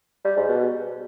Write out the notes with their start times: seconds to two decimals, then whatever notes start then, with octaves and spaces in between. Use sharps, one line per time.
0.25 G3
0.36 G#2
0.48 B2